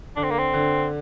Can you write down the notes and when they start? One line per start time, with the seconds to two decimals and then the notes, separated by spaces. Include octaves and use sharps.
0.16 D3 D4
0.23 C4
0.31 A#3
0.39 C4
0.53 D3